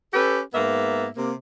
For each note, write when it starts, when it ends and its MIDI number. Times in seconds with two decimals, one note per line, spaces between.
0.14 0.39 61
0.14 0.39 67
0.14 0.39 69
0.14 0.39 71
0.54 1.07 44
0.54 1.07 58
0.54 1.07 59
0.54 1.07 76
1.16 1.31 48
1.16 1.31 58